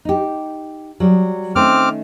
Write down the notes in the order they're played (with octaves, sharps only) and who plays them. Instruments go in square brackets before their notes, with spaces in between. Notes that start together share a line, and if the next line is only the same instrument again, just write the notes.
[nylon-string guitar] D#4 G4
F#3 G3
[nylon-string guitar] D#3 A3 C#4 [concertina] C4 D6 F6